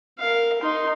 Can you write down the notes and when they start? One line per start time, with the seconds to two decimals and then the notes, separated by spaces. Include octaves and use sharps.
0.19 A#4 F5
0.61 D#4 C6